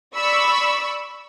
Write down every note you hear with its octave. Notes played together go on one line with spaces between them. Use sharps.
D5 B5 C#6 E6